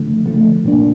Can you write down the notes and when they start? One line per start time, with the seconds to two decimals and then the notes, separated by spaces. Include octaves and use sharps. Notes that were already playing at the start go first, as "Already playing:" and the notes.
Already playing: D3 F3 A3
0.26 D3 F3 A3
0.65 A#2 F3 A#3 D4